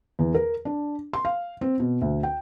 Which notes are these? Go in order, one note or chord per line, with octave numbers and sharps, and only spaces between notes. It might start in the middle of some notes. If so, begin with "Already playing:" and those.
E2
A#4
D4
C6
F5
C4
B2
D2
G5